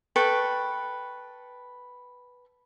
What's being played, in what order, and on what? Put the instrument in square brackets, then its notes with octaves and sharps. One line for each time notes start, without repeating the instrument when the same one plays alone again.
[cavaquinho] A4 B4 G5 C#6